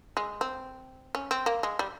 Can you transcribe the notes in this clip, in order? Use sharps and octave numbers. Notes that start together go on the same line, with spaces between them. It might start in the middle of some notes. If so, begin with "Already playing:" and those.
G#3
C4
C#4
C4
A#3
G#3
G3